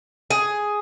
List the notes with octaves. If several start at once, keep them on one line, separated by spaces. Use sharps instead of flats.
G#4